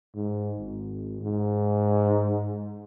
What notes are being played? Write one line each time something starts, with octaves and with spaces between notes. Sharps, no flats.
G#2
G#1
G#2